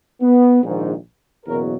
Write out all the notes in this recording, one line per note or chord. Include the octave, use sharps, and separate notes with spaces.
B3
A#1 G#2 D#3
F#1 E2 B2 F#3 A#4